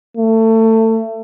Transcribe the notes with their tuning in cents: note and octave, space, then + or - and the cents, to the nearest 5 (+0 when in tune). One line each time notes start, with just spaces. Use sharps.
A3 +25